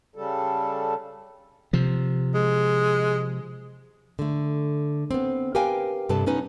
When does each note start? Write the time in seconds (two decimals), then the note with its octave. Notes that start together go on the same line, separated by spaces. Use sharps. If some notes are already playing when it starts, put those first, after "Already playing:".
0.16 C#3 G3 A4
1.73 C3 F3
2.34 G#3
4.19 D3 A3
5.11 B3 C4
5.55 G4 A#4 B4 F5 G5 G#5
6.09 G2 C3 G4 A4 B4 A5
6.26 B3 C#4 D#4 B4